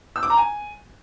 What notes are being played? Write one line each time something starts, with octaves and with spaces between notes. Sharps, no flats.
E6
D6
A#5
G#5